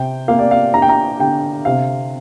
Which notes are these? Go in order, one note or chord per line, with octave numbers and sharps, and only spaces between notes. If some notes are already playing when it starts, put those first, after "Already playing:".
Already playing: C3 G5
A#3 F5
D5
F5
D4 A#5
G5
A#5
D3 G5
C3 F5